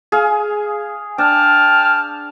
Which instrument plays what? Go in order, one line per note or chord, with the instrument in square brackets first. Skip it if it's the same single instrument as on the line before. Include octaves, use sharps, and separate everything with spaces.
[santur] G#4 F5
[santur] D4 [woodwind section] G5 A5 F6